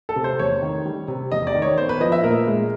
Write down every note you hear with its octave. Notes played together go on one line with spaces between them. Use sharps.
A4
C3
C5
E2 C#5
D#3
G3
C3
E2 D#5
D5
D#3
C#5
B3 C5
B4
F3 D#5
E5
A#2 A#4
G#3